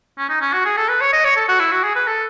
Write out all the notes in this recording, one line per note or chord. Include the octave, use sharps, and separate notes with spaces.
C#4
D#4
C#4
F#4
G#4
A4
B4
C#5
D#5
C#5
A4
F#4
E4
F#4
G#4
B4
A4